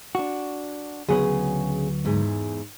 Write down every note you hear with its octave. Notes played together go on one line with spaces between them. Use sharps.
D4 F#4
D2 C#3 F#3 B3 G#4
E2 G#2 G#4